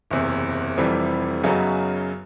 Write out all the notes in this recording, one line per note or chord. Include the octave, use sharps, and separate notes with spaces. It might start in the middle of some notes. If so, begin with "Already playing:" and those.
F#1 E2 C3
F1 F2 C3 E3 G3
F#2 C#3 F#3 B3 D#4